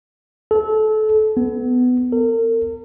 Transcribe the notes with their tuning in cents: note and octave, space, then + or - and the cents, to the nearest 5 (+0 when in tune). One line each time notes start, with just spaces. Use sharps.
A4 -25
B3 +20
A#4 -40